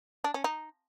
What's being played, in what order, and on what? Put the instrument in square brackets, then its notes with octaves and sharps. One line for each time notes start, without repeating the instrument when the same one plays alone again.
[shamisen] D4
C#4
D#4